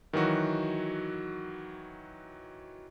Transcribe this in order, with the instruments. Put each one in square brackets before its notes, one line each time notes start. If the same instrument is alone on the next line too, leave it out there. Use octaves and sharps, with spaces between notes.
[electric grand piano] D#3 E3 F#3 F#4